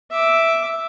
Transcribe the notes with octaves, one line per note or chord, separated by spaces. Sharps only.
E5 D6